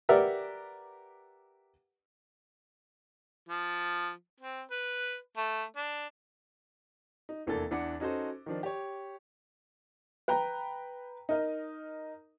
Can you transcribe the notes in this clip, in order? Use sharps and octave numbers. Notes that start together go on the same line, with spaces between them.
G4 A#4 B4 D5 E5 F#5
F3
C4
B4
A3
D4
D#4
F1 E2 A#3 D4 A4 A6
E2 D4 F#5 D6 C#7
C#4 D#4 F#4 A4 C5
D#3 F3 D4
G4 C#5
B4 G5 A#5
D#4 A#4 D#5